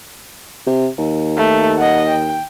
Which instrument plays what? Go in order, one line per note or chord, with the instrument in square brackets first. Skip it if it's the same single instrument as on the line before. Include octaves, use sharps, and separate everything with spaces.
[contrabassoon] C3
D#2
[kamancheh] A3
D#5 F#5
G5